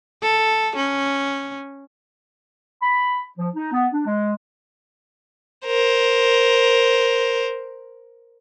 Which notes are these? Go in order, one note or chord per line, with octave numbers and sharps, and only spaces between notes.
A4
C#4
B5
F3
D#4
B3
D4
G#3
A#4 C5